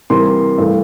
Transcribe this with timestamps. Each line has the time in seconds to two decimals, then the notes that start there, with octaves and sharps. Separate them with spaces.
0.10 C3 E3 G3 A#3 C6
0.58 G2 E3 A3